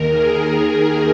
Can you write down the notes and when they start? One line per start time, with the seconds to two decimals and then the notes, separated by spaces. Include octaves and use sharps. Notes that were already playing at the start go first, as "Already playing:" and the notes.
Already playing: D#2 D#3 A#4
0.10 G#4